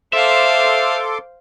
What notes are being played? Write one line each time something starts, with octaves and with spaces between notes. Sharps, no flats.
A4 C5 E5 F5 C6 D6